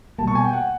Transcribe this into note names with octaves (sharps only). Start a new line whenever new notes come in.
B2 G3 A#3 A5
C#6
G#5
G5
F#5